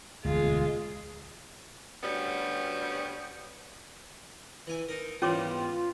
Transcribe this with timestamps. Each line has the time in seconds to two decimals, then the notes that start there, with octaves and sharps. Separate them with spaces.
0.25 E1 D2 G#3 F4
2.03 D2 F#3 G3 B3 C#4
4.67 E3 G#5
4.89 D#4 A#4
5.22 E2 G#2 G3 C#4 F4 C#5 D6